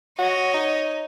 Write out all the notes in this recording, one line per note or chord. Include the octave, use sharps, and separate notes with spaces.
F#4 C#5 D#5
D#4